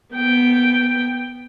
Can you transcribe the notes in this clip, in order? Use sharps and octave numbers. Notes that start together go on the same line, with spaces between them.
B3 G5